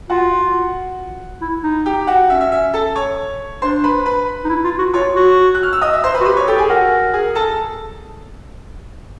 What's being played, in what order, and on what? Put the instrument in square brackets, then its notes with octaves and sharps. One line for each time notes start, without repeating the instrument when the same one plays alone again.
[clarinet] F4 [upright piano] F#4 F#5
[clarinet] E4
D#4
[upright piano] G4 G5
F#4 F#5
[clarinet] C#4 [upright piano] E5
[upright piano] E5
E5
A4 A5
C#5 C#6
[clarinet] D4 [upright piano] C5 C6
[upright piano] B4 B5
B4 B5
[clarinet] D#4
E4
F4
F#4
[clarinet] F4 [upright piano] C#5 C#6
[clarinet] F#4
[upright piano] F#6
F6
E6
D#5 D#6
E5 E6
C5 C6
B4 B5
[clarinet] F#4
[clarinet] G4 [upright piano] B4 B5
[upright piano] C#5 C#6
[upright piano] G4 G5 [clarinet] A4
[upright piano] G#4 G#5
[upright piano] F#4 F#5 [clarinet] A#4
[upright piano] G#4 G#5
A4 A5